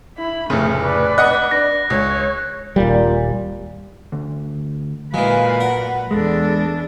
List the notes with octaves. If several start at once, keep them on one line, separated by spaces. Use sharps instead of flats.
E4 B5
F1 A2 C#3 A3
B4 D5
D#5 F#5 D#6 F#6
D4 A#6
C#2 C#5
D#1 A#2 G3
D2
A#2 E3 F#3 G#3 B4 F5
A#4 F#5
E2 G#3 D4 A4